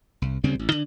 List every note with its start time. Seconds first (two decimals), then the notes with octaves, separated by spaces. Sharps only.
0.22 C2
0.44 D2 C#3 G3 C4
0.59 A1
0.72 D3